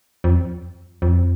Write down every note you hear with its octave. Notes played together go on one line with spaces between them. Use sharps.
F2
F2